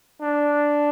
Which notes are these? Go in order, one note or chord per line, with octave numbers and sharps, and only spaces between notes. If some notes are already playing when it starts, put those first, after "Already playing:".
D4